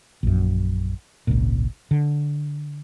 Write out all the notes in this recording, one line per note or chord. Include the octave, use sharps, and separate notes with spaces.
A#1 F#2
G#1 C#2 A#2
D3